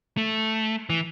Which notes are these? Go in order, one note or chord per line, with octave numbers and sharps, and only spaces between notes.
A3
E3